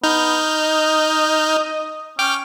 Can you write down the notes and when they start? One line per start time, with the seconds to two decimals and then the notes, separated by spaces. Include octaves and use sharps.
0.03 B3 D#4 F6 G6
0.58 D#5
2.19 C#4 G5 D6 F6